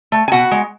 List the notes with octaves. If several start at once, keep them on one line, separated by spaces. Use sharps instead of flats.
A3
G#5
B2 F#4 F#5
G#3